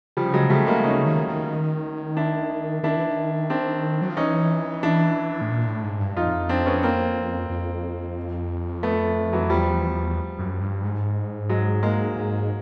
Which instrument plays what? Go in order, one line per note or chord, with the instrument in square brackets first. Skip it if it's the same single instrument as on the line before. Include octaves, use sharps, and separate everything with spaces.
[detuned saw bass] C#3 [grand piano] F3 G3
[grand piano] F#3 G#3
[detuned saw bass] C#3 [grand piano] G3 A3
[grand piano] G#3 A#3
[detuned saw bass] C#3 [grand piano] C#4 D#4
[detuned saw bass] D#3
D#3
[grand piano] D4 E4
[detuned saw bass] D#3 [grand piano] D4 E4
[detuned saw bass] E3
D#3
[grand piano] C4 D4
[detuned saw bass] F#3
F3
[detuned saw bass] E3 [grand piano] C#4 D#4
[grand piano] D4 E4
[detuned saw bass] A2
A#2
A2
G#2
G2
[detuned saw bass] F2 [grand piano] D#4 F4
[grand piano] C4 D4
B3 C#4
A#3 C4
[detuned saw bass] F2
[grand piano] A3 B3
E3 F#3
[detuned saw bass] E2 [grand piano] F3 G3
[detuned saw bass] F#2
G2
G#2
[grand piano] F#3 G#3
G#3 A#3
[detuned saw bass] G#2